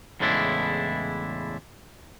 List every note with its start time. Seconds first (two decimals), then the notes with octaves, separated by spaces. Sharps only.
0.20 E2 A2 C#3 G#3 D4 E4